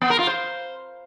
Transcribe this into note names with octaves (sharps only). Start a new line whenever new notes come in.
B3
A#4
F4
C5